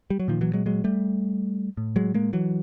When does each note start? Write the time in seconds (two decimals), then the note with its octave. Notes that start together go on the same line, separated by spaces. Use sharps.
0.10 G3
0.20 F#3
0.28 A#2 D#3 F3
0.41 E3 F#3
0.53 F#3 G#3
0.66 F#3 G#3
0.84 G3 A3
1.77 A2
1.96 F#3 G#3
2.14 G#3 A#3
2.33 E3 F#3